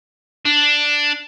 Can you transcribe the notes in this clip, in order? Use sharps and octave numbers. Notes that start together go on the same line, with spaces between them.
D4